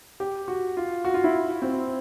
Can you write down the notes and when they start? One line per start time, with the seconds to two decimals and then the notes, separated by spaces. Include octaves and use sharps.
0.20 G4
0.48 F#4
0.77 F4
1.05 F#4
1.14 F4
1.24 E4
1.62 C4